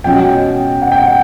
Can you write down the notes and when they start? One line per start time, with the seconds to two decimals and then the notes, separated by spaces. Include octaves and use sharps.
0.04 B2 G#3 C#4 F#4 G5
0.82 F#5
0.92 G5
1.02 F#5